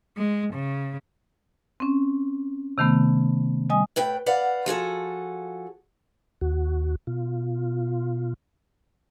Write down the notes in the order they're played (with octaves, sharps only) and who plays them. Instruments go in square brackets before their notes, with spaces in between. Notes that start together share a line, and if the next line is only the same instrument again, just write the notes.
[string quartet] G#3
C#3
[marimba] C4 C#4
C3 D#3 A3 B3
G3 D#5 G#5 D#6
[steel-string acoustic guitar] A2 B4 G5
B4 D5 F5 F#5
F3 F#4 G#4 A4
[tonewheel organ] D#2 F#4
B2 F4